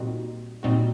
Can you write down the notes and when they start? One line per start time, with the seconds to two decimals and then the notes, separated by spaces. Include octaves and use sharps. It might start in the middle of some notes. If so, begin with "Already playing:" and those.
Already playing: A#2 G3 C4 D#4 F#4
0.63 A#2 G3 C4 D#4 F#4